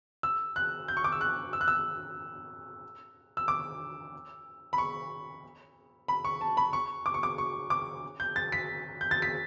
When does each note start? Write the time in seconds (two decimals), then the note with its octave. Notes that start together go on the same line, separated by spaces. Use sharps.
0.23 E6
0.56 F#6
0.88 G6
0.97 C#6
1.04 D6
1.12 E6
1.21 F#6
1.53 E6
1.61 F#6
1.68 E6
3.37 E6
3.48 D6
4.73 B5
4.78 C#6
6.08 B5
6.25 C#6
6.41 A5
6.57 B5
6.73 C#6
7.06 D6
7.14 C#6
7.23 D6
7.38 C#6
7.70 D6
8.20 G6
8.36 A6
8.52 B6
9.01 G6
9.11 A6
9.22 B6